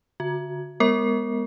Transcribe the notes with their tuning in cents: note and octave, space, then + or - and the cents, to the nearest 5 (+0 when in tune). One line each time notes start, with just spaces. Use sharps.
D3 -30 F#4 -30
G#3 +0 B3 +0 A#4 -10